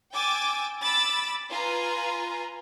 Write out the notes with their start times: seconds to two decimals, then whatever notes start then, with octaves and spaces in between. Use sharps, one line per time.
0.13 G5 G#5 D6 E6 A6
0.82 B5 D6 E6 A6
1.51 F4 B4 G#5 A#5